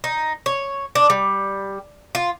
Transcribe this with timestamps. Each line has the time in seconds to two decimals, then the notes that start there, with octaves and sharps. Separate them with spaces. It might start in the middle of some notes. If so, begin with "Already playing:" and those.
0.04 D#4
0.46 C#5
0.95 D4
1.10 G3
2.15 F4